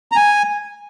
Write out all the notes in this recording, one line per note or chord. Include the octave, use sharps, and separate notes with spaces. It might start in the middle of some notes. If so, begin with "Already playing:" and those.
A#5
G#5